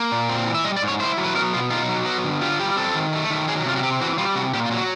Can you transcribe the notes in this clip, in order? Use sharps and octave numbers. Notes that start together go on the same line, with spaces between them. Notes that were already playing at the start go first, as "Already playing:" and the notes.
Already playing: A#3
A#2
C4
E3
E5
G3 D#5
D5
G#2
C#5
E4 C5
F#3
B4
B3 A#4
B2 F4
D#4 F4
F#3
B3 F#4
D3
F4 G4
G3 G4
C4 A4
D#3
A3
D#3
F#3 G#4
C3 F4
F#4
C4 G4
E3 F#4
G3 F4
C3 F#4
A#2 G4
F4
F#3
F#4